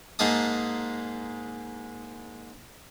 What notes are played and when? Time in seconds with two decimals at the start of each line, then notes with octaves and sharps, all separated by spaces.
0.19 G#2 G#3 A#3 A5 D#6